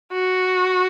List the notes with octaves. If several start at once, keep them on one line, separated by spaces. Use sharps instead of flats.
F#4